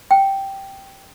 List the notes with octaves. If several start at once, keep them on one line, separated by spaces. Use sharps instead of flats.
G5